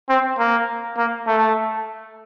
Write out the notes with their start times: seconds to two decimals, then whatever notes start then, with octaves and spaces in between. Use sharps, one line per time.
0.09 C4
0.39 A#3
0.97 A#3
1.27 A3